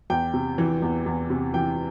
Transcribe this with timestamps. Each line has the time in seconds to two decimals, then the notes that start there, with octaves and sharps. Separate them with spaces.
0.10 E2 G5
0.34 C3
0.58 E3
0.82 E2
1.06 E2
1.30 C3
1.54 E3 G5